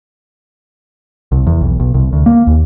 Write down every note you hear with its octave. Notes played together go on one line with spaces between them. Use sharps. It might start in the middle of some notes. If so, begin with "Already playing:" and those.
C2
E2
B1
B1
C2
D2
A#3
D#2